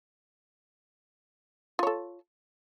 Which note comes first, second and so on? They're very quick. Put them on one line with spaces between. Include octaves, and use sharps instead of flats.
F4 C#5 A4